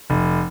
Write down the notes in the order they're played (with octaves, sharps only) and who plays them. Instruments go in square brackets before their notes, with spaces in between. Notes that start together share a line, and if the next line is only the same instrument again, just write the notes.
[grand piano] F1